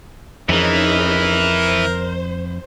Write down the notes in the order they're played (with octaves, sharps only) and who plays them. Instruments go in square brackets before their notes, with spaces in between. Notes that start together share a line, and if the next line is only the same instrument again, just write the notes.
[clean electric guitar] F2 [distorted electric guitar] E3 [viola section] C#4 D#4 G#4 [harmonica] A#4
[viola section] C5